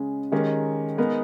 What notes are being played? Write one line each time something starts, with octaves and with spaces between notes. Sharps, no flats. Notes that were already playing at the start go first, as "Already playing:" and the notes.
Already playing: C#3 G#3 C#4
D#3 G#3 C#4 G4 A#4
G#3 B3 D#4 A#4